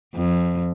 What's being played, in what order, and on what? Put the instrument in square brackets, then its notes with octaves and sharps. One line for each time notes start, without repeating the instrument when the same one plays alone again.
[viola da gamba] F2